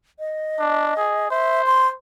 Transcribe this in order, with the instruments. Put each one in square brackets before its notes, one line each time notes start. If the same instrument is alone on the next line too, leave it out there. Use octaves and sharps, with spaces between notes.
[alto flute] D#5
[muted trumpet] D4
G#4
[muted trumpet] C5 [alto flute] E5
[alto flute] C6